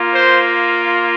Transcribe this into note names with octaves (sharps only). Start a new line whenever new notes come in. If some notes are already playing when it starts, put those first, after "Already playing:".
Already playing: A#3 F4
C5